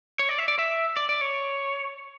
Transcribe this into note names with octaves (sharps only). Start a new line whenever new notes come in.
C#5
D5
E5
D5
E5
D5
D5
C#5